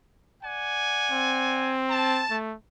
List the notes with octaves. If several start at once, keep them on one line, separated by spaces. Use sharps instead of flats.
D5 F#5 G#5
C4
A5
A3